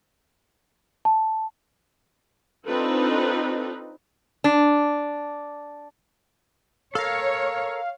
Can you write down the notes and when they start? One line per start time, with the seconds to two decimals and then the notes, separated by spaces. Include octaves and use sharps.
1.05 A5
2.67 C4 D4 D#4 F4 A4 B4
4.44 D4
6.95 A4 A#4 C#5 F5